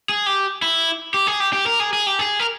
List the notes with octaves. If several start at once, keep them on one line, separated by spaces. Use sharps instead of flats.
G#4
G4
E4
G4
G#4
G4
G4
A#4
G#4
G#4
G4
G#4
A#4